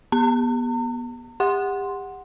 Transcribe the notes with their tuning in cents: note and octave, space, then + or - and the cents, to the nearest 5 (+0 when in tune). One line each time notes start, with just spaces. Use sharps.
B3 -25 A#5 -45
G4 +35 F#5 +0 C6 +0